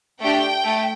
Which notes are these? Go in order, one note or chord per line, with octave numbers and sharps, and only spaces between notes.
A3 D4 G4 G5
A3